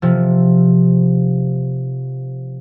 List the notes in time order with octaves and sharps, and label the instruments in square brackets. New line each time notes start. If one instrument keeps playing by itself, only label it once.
[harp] C3 F3